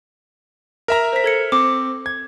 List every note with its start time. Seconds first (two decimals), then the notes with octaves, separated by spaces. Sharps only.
0.88 A#4 E5 A#5
1.13 C5 B6
1.24 A4 G#6 C#7
1.52 C4 D6
2.06 G#6